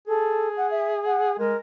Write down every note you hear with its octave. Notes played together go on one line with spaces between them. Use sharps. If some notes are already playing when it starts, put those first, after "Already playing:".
G#4 A4
F#5
E5
F#5
G#3 A#4